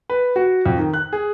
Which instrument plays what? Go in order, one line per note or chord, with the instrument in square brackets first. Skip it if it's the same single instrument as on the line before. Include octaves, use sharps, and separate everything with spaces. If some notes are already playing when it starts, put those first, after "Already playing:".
[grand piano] B4
F#4
F2
D#3
F#6
G#4